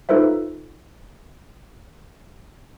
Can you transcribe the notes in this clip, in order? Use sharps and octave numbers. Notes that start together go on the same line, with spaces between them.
D#4 F4 A4 B4 C5 E5